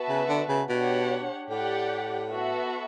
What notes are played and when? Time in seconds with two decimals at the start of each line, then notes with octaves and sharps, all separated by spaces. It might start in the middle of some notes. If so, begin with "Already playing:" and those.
Already playing: B3 F#4 B4 E5 A5
0.09 C#3
0.28 D3
0.49 C#3
0.69 B2 D4 G4 C#5 F#5
1.50 A2 G4 D5 F#5
2.30 B3 F#4 A4 E5